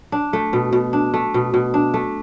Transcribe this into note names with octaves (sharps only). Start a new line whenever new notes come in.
D4
A3
B2
B2
D4
A3
B2
B2
D4
A3